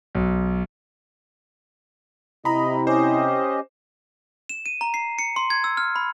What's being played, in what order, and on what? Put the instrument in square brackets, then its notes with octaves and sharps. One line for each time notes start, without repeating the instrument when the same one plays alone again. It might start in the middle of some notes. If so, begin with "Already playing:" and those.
[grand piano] B1
[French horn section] C3 E4 [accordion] D#5 [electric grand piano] A#5 B5
[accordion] C#4 G4 D#5 [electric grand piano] C5
[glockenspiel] E7
D#7
A#5
C7
C#7
C6
G#6
E6
F6
B5